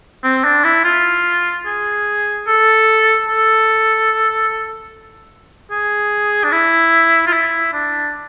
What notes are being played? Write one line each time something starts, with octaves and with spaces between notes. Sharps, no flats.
C4
D4
E4
F4
G#4
A4
A4
G#4
D4
E4
F4
E4
D4